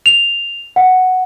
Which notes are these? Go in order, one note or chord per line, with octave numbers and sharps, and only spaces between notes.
F7
F#5